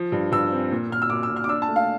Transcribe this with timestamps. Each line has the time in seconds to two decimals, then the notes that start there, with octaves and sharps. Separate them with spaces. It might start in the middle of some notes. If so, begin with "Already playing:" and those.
Already playing: F3
0.12 G2
0.32 G2 E6
0.52 C4
0.72 A#2
0.90 A#2 F6
1.02 E6
1.10 A#2 D6
1.23 E6
1.30 A#2
1.36 F6
1.44 D6
1.49 D4 E6
1.62 A5
1.68 A3
1.76 F5